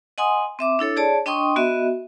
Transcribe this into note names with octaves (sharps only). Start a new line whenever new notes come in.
D#5 F#5 G#5 C6 D#6
C4 E5 D6
D4 E4 A4 C#5
G#4 C#5 D5 A5
D4 D#5 G5 C6 C#6 D#6
B3 F#4 D#5 E5